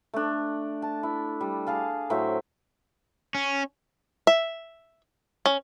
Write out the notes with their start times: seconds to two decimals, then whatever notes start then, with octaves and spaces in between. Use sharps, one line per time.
0.14 A3 D4
0.82 A5
1.03 E4
1.41 G3
1.67 G#4 F5 A5
2.10 A2 F#3 C5 E5
3.35 C#4
4.27 E5
5.46 C#4